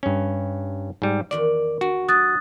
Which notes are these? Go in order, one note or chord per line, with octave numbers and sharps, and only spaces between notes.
G2 C#4
G#2 G3
E2 D#3 F#4 D5
D4 F#4
F#3 D4 D#6 F#6 A6